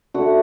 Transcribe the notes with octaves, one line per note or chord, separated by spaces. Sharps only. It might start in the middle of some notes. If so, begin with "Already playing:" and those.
D3 A3 F#4 F#5